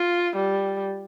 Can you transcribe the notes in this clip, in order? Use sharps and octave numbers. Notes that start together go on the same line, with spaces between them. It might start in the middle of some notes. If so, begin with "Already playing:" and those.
Already playing: F4
G3